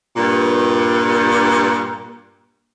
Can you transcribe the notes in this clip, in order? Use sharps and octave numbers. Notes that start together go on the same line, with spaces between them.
G2 A#2